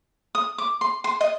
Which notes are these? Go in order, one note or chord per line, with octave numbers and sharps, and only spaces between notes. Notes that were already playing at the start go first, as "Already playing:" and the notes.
D#6
D6
C6
C6
D#5